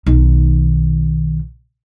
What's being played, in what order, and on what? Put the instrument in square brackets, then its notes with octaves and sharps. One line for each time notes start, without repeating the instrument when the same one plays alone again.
[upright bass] B1 D#3